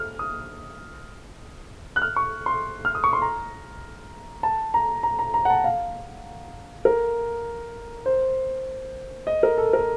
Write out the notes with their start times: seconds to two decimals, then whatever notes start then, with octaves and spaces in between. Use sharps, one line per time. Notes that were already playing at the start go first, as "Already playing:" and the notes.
Already playing: F6
0.19 D#6
1.96 F#6
2.02 F6
2.16 C#6
2.46 C6
2.85 F6
2.95 D#6
3.04 C#6
3.13 C6
3.22 A#5
4.43 A5
4.74 A#5
5.03 A#5
5.19 A#5
5.34 A#5
5.45 F#5
5.50 A5
5.64 F5
6.85 A#4
8.06 C5
9.27 D#5
9.43 A#4
9.58 A4
9.73 A#4